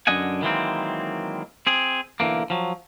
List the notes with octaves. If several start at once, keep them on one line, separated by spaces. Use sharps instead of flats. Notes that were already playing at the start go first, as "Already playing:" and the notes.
F#2 D3 D4 D#5 F#5 G#5
D#3 E3 F#3 G#3 A#3 C4
C4 G#4
B1 D3 E3 F#3 A#3
F3 F#3